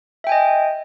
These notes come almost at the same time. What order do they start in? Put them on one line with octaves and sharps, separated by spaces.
E5 G5 G#5 D#5